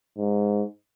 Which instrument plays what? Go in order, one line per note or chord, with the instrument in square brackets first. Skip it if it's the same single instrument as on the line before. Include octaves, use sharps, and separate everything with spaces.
[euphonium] G#2